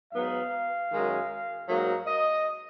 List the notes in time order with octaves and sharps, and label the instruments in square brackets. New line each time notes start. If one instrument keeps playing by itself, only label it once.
[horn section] G#2 F#3 B3 D#4 F5
F#2 D#3 G#3
G#2 F#3 A#3 D#4
D#5